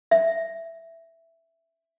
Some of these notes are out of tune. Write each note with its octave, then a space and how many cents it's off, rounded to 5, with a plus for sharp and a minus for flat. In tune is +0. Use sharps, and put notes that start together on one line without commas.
E5 +5